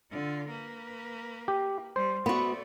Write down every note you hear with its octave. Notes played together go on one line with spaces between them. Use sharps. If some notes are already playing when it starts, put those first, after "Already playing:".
D3 F4
A#3 B4
G4
G3 C5
A3 B3 F#4 D5